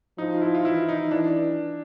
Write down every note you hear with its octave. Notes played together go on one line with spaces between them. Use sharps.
F3 D#4
F4
E4
F4
E3 E4
D#4
E3 D4